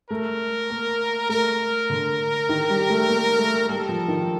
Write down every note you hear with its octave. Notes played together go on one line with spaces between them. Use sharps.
A3 A#4
A#3
A3 A#4
D3
D#3
G3
A3
A#3
A3
G3 A4
F3
D#3